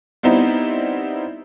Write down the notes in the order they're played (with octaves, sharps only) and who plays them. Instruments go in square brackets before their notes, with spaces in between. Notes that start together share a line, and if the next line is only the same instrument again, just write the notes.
[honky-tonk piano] G3 B3 C4 D#4 E4